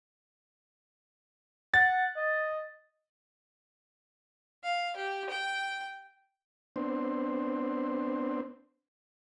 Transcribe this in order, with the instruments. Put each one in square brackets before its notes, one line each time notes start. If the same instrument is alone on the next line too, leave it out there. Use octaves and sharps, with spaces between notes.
[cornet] F#5 [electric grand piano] A6
[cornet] D#5
[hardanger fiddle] F5
G4
G5
[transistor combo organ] B3 C4 D4 C5